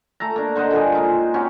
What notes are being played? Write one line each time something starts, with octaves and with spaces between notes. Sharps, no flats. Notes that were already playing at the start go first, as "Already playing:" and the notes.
A3 A4 A#5
A#3 D4
D3 C5 D#5 F#5
A#2 D3 G3 G#4
G#3 D#4 F4
C4 C#4 F#4 G4